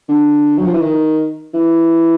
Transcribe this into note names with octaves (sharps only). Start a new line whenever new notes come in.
D3
F#3
F3
E3
D#3
E3